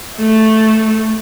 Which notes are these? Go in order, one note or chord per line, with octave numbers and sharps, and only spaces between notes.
A3